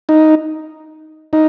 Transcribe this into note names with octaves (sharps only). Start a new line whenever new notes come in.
D#4
D#4